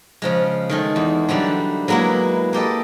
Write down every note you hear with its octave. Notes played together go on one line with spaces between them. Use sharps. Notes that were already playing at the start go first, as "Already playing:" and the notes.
C#3 F3 G#3
D#3 G#3 A3
E2
D3 F#3 G3 A3
F#3 G#3 A#3 B3 E4
A#3 G4 A4 D#5